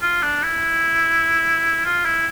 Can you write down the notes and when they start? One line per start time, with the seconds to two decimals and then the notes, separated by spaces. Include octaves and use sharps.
0.02 F4
0.23 D4
0.43 E4
1.85 F4
2.05 E4